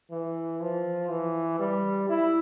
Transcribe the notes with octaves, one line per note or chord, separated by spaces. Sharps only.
E3
F3
E3
G3
E4